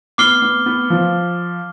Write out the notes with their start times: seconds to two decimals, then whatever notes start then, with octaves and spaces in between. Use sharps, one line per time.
0.18 B3 D6 F6 C7 G7
0.42 B3
0.66 B3
0.90 F3